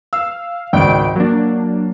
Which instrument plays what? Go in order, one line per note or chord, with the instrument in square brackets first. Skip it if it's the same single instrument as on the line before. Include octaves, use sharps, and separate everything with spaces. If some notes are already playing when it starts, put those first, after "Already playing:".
[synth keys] F5 [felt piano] E6
[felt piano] G#1 C#2 D5 [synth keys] G5 D7
[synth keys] F#3 D4 [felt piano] A#3